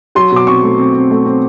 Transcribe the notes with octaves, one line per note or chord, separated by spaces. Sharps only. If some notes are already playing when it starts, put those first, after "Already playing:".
F#3 C6
B2 D6
C4 C#6
A3
C4
C4
A3
C4